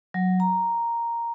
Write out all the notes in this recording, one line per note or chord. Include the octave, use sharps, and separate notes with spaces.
F#3
A#5